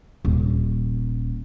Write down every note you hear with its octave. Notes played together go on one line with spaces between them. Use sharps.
D#1